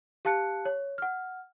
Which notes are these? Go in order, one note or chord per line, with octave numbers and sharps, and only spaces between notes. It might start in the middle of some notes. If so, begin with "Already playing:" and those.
G4 F5 A5 F#6 C#7
C#5
F#5 F6